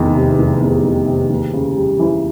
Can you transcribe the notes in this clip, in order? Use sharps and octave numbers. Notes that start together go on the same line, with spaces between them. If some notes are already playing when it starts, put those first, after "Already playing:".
Already playing: F1 E2 D#3
C3
F1
E2
D#3
C3
D#2
C#3
G3
E3